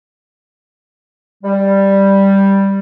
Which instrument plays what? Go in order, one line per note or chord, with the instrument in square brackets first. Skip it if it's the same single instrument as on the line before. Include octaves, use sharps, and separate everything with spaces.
[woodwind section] G3